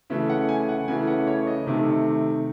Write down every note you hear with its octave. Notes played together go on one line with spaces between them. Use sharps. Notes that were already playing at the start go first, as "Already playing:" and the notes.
C#3 E3 A3 E5
F#5
G#5
F#5
C#3 E3 A3 G#5
F#5
C#5
D#5
C3 D#3 A3